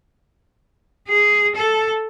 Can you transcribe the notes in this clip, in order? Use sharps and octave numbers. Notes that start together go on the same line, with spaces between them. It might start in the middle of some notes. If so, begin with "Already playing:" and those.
G#4
A4